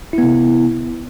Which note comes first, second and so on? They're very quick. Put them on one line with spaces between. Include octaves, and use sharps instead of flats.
E4 B3 C3